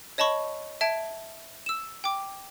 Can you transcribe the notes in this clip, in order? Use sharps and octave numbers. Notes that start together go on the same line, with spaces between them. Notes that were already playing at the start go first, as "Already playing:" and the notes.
C#5 D#5 A5 B5 C#6
E5 A5 G#6 D7
E6 E7
G5 D6